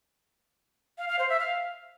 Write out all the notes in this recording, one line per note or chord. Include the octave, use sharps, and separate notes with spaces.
F5
F5
C5
E5
F5